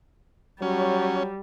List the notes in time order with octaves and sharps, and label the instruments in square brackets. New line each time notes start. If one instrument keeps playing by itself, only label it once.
[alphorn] F#3 [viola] G3 [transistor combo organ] C#4